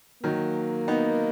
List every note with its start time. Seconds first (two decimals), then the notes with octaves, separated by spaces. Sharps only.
0.23 D#3 F#3 A#3
0.88 B3 D#4